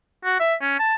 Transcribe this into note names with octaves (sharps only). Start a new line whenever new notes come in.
F#4
E5
C#4
A5